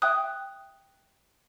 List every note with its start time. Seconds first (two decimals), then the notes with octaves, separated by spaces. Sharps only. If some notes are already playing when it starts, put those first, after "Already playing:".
0.02 E5 G5 D#6 F#6